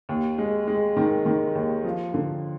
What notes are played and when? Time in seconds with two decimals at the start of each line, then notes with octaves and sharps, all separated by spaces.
0.09 D#2
0.38 G#3
0.67 G#3
0.97 D#3
1.26 D#3
1.55 D#2
1.85 F3
2.14 D3